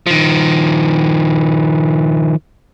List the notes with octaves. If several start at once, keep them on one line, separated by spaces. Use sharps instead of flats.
D#3 F3